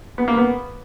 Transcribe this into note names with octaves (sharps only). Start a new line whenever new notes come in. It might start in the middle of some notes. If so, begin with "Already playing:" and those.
B3
A#3
B3